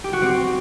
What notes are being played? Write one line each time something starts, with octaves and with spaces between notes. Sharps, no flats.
G4
F#4
C4